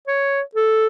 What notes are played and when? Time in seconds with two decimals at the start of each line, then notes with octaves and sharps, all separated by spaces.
0.08 C#5
0.55 A4